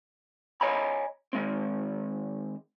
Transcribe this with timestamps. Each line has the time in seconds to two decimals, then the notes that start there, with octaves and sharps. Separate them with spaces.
0.61 C#5 D#5 G#5 A#5 B5
1.33 D#3 G#3 C4